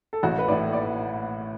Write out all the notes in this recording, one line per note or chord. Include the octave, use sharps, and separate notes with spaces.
A4
A1 F#4
B4
A2 E3 D5
D5